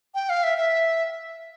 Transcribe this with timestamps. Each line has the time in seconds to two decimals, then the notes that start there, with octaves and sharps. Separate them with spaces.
0.15 G5
0.29 F5
0.43 E5
0.58 E5